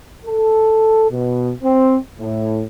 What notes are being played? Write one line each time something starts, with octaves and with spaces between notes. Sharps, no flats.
A4
B2
C4
A2